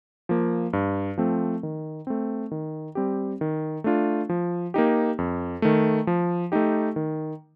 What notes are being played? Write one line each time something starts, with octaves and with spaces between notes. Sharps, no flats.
F3 A#3
G2
F3 A3 C4
D#3
A3 C4
D#3
G3 C4 G4
D#3
A3 D4 F4
F3
A#3 D#4 G4
F2
D#3 A3
F3
A3 D#4 G4
D#3